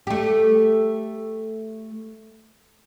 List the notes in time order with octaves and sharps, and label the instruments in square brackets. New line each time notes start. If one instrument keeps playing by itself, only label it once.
[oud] A3 G4